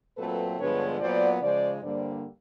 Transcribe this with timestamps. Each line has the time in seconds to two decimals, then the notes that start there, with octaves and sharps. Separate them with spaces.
0.17 A#2 F#3 A3 C4 A4 B4
0.58 G2 D3 F3 G#3 B3 B4 C#5
1.00 A#2 F#3 B3 C5 D5
1.41 C#3 F3 G#3 C5 D5
1.82 G2 D3 G3 A#3 C5 D5